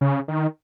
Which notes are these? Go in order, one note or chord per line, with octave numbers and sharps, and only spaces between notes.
C#3
D#3